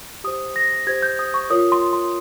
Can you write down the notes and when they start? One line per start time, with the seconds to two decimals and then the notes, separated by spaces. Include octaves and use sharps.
0.24 G4 C5 D#6
0.56 A#6
0.87 G4 C5 G#6
1.03 G6
1.19 D#6
1.34 C#6
1.50 F4 A#4 C#5 D#6
1.72 C6
1.93 C6